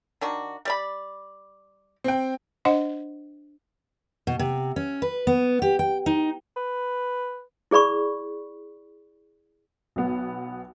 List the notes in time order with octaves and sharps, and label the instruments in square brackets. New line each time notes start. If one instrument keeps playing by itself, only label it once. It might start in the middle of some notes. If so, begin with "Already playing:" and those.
[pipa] D#3 D4 F#4
G3 D5 B5
[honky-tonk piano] C4 G5
[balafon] D4 C5 D#5 F#5
[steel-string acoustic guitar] B2
C3
C#4
B4
B3
G4
G5
D#4
[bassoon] B4
[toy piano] E4 G#4 D5 B5 C#6
[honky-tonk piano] B1 B3